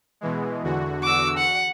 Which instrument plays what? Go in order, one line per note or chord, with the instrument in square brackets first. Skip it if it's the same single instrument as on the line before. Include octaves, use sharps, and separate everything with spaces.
[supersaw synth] B2 E3 G#3
E2 D3 F#4
[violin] D6 E6
F#5